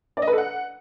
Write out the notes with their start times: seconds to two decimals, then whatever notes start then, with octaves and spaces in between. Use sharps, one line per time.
0.17 D5
0.22 D#5
0.27 B4
0.33 A4
0.38 F#5